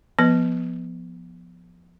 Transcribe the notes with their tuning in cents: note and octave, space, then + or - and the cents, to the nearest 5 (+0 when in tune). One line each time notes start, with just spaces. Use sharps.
F3 +0 B3 -15 B4 +0